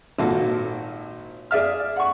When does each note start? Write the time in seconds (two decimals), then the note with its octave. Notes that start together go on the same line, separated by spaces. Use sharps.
0.19 G#1 A#2 A#3 F#4 A4
1.51 G#4 D5 E5 F6
1.96 F#5 C#6